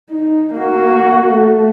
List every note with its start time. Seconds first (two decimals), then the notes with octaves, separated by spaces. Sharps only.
0.11 D#4
0.54 A#3 F#4
1.30 A3